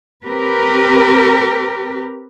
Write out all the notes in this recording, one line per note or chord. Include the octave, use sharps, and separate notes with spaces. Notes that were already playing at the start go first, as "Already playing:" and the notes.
C4 G4 A#4 B4